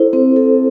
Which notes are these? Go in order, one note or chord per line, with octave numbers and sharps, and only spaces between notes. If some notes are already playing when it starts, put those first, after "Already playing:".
Already playing: E4 A4 C5
C4
A4